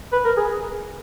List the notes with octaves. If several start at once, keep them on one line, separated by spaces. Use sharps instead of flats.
B4
A#4
G#4